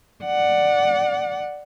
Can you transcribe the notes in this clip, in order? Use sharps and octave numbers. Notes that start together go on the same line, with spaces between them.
D5 F#5